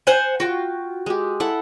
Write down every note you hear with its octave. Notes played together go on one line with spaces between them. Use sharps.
C5 F#5 G#5
F4 F#4 G5
G#3 G4
E4 A4 F#5